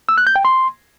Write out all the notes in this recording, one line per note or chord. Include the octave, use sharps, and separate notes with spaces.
E6
F#6
G6
G5
C6